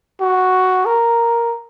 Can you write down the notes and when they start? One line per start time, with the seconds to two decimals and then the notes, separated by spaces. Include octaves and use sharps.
0.21 F#4
0.86 A#4